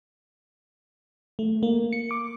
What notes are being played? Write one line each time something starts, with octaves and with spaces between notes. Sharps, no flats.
A3
A#3
C#7
D6